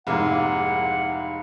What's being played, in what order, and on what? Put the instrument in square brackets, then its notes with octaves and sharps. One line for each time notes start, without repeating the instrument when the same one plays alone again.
[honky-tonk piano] F1 G#2 [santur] A#3 E4 F5 [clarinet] F#5